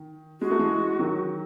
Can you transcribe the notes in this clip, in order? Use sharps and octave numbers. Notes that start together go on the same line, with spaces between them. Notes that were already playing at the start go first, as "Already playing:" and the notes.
Already playing: D#3
G#3 F#4
A3
E3 G#3
D#3 F#3